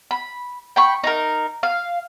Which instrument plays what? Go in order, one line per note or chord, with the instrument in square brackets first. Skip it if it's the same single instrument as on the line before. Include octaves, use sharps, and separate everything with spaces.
[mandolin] B5
G5 B5 C#6
D#4 A#4
F5